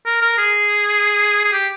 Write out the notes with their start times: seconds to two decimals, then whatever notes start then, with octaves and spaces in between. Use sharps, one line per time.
0.06 A#4
0.22 A#4
0.38 G#4
1.44 G#4
1.53 G4